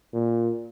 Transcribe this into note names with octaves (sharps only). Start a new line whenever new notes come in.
A#2